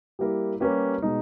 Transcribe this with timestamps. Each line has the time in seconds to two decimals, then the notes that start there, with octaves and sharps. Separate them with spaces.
0.19 G3 A#3 E4 G4 A#4
0.60 G3 A#3 C#4 G4 B4
1.02 B2 G#3 D#4